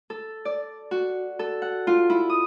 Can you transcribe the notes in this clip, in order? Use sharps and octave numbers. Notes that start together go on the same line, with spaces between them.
A4
D5
F#4
A4
F#5
F4
E4
D#6